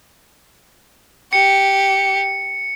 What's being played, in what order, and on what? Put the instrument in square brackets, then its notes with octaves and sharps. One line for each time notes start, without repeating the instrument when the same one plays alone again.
[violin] G4 [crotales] C#7